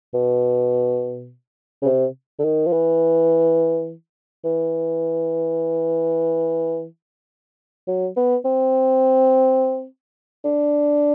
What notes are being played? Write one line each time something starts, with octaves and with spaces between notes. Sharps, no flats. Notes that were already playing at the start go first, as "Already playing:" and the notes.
B2
C#3
C3
D3
D#3
F3
E3
E3
F#3
B3
C4
D4